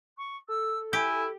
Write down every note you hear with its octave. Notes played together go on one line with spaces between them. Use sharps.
C#6
A4 E6
E4 G4 G#5